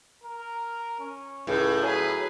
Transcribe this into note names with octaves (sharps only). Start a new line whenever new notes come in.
A#4
C#4
C#2 A2
F#3 G#4 B4